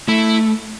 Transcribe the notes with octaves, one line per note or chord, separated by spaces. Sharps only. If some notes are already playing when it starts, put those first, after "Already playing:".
A3 E4